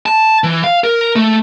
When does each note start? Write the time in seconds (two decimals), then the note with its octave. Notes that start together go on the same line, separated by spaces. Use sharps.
0.06 A5
0.44 E3
0.64 F5
0.84 A#4
1.16 A3